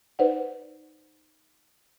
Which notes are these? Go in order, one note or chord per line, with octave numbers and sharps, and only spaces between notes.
D#4 B4 C5 D5 F#5